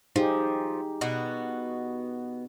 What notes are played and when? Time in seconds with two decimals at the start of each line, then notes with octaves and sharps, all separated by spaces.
0.16 F3 D#4 G4 G#4
1.01 B2 B3 F#4